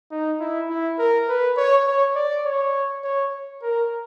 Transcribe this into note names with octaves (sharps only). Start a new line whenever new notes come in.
D#4
E4
E4
A#4
B4
C#5
C#5
D5
C#5
C#5
A#4